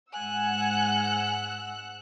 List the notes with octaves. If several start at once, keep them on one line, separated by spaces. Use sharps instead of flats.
G#2 F#5 G#5 E6 F#6